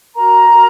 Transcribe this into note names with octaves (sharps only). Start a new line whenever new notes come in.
F#4 A#4 A#5
F#4 A#4